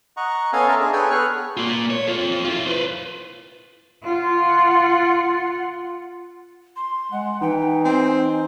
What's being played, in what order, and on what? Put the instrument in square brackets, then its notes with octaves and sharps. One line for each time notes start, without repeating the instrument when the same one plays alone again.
[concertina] D#5 F#5 A#5 C#6
B3 C#4 A4 D#5 F5 G#5
A#4 D#5 E5 A5 A#5 C6
D4 G#4
G#4 A4 B4 C#5 G5 G#5
B3 G#4 B4 C#6 F6 F#6
[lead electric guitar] A#3 F4
C#5
F4 A4
E4 F4
B4 C5
[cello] F4 F#5
[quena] C6
[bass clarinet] G#3 [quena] F#5
[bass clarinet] E3 [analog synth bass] D#4 [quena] G5
[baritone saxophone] C4 [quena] G#5